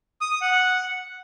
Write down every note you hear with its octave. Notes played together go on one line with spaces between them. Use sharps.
D#6
D#6
F#5
F#5